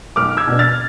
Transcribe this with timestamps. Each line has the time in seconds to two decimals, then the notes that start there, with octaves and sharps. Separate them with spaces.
0.16 B1 D6 F6
0.37 E6 G#6
0.47 B2 B3 D4
0.59 F6 A6